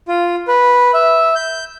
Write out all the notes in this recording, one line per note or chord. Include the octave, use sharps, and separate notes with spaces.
F4
B4
E5
G6